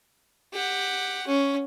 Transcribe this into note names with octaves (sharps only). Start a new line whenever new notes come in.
G4 F#5
C#4